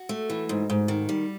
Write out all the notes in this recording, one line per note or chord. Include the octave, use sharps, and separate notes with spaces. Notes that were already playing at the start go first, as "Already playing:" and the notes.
Already playing: F#4
A3
E3
G#2
G#2
D#3
G3